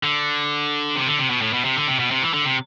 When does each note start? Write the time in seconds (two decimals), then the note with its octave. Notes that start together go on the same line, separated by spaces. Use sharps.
0.03 D3
0.95 C3
1.07 D3
1.19 C3
1.30 B2
1.42 A2
1.53 B2
1.65 C3
1.76 D3
1.88 C3
1.99 B2
2.11 C3
2.22 E3
2.34 D3
2.45 C3